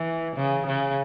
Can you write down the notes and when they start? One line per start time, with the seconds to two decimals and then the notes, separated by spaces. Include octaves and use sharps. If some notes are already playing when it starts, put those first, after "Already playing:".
Already playing: E3
0.36 C#3
0.67 C#3